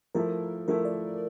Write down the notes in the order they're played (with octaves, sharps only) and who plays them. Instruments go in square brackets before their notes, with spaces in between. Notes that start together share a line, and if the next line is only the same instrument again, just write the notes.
[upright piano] F3 A3 E4 [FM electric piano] A#4
[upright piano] F3 A3 E4 [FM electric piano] A#4
[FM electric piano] D5